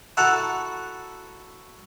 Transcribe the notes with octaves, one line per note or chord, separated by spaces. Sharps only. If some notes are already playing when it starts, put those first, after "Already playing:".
E4 F#4 A4 F#5 A#5